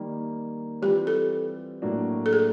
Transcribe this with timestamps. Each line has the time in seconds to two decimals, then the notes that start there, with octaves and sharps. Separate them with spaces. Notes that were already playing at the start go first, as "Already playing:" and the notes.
Already playing: D#3 G3 A#3
0.82 E3 G3 C4 F4 G4
1.07 A4
1.82 A2 F#3 A#3 D4 F#4
2.26 A4
2.33 G#4